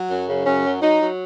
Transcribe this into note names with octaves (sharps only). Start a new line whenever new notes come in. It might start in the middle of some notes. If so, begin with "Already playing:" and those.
Already playing: F#3
F#2
C#3
F#2 C#4
F#3
F#3 D#4
F#3